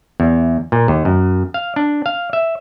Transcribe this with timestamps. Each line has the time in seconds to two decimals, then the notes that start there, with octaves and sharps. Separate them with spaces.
0.20 E2
0.72 A#2
0.88 D#2
1.05 F#2
1.54 F5
1.76 D4
2.06 F5
2.33 E5